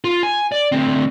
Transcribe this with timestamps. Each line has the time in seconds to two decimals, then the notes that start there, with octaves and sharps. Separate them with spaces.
0.04 F4
0.23 G#5
0.52 D5
0.72 D2 C4